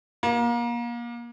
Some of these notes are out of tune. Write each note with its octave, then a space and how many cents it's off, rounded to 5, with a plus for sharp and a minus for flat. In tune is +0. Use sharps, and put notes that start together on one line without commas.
A#3 +30